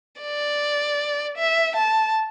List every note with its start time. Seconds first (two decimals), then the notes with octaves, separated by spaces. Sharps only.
0.22 D5
1.37 E5
1.76 A5